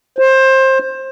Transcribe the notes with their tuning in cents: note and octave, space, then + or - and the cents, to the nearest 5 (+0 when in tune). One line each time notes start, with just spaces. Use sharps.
C5 +20